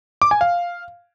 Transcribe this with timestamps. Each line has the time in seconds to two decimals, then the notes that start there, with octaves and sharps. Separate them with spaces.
0.22 D6
0.31 G#5
0.41 F5